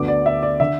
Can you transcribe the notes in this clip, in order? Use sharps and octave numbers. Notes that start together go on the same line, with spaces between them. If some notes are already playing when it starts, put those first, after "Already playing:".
Already playing: D2 D3 B3 D6
D5
E5
D5
D3 E5